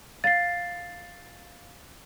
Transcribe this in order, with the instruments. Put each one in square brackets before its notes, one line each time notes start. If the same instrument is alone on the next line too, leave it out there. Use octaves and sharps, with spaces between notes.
[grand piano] F5 [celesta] A6 C7